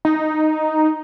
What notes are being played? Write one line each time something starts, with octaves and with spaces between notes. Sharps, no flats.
D#4